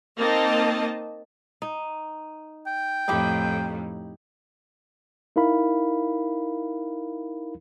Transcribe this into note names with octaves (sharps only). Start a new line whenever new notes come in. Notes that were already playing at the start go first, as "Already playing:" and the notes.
A#3 C4 D#4 D#5 A5
D#4
G5
F2 A2 D#4 E4 G4
D#4 E4 A#4 F5 B5